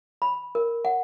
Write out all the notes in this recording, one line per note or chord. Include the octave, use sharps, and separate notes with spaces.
B5
A#4
F#5